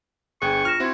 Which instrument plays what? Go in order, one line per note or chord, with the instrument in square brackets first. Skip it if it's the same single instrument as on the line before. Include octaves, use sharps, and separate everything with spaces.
[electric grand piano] G1 G#4 [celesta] D4 G5 F#6 [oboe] C#6
[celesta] F4 A#6 E7 [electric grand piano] F6
[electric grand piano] C4 E4 F#4 [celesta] C5 C6 G#6